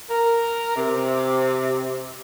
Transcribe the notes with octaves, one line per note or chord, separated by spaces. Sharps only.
A#4
C3